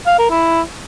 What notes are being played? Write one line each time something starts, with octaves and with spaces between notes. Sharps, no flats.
F5
A#4
E4